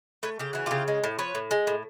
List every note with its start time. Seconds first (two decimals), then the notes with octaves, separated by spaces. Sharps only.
0.23 A3 B4 C#5
0.39 C#3 G4
0.53 E3 F#4
0.66 C#3 F4 G4
0.88 G#3
1.04 A2
1.19 F3 B4 C#5
1.35 A2
1.51 G#3
1.67 A2